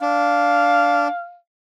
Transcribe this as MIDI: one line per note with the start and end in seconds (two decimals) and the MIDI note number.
0.01 1.08 62
0.01 1.35 77